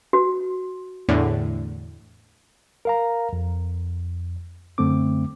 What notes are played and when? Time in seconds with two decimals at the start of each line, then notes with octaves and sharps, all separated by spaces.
0.13 F#4
1.09 E2 A2 D3
2.85 A#4 F5 A#5
3.33 F2
4.78 F#2 D3 A3 C4 D6